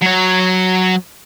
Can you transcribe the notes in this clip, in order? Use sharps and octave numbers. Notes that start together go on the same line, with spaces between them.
F#3 C#5